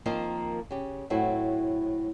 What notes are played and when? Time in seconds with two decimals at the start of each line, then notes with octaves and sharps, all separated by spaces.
0.06 D#3 F3 A#3 C4 A#4 D#5
0.71 C#3 G4
1.10 A2 F#3 C4 E4 F#4